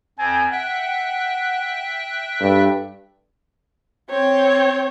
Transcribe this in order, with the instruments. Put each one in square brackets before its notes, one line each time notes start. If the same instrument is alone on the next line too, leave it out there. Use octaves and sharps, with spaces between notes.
[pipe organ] F2 C4 C5 [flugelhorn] G#5
[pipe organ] E5 G5 F#6 [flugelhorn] F#5
[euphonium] G2 [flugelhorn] A4
[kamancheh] C4 C#5